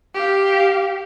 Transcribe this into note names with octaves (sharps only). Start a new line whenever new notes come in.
G4 F5